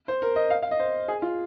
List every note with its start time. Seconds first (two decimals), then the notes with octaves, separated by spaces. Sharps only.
0.08 C5
0.22 A#4
0.36 D#5
0.50 F5
0.62 F5
0.71 D#5
0.79 C5
1.08 G#4
1.22 F4